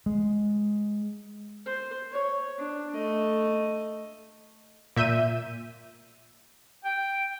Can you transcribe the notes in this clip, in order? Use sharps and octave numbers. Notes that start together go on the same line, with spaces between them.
G#3
C5
C#5
D4
A3 D#5
A#2 E5 G6 D#7
G5